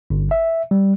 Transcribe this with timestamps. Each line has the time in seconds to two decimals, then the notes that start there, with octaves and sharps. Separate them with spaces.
0.10 G1
0.31 E5
0.71 G3